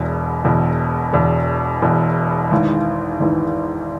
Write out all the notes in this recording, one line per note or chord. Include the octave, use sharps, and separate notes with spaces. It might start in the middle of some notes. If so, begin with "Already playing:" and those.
Already playing: E1 E2 B2
E1 E2 B2
E1 E2 B2
E1 E2 B2
G#1 G#2 E3
G#1 G#2 E3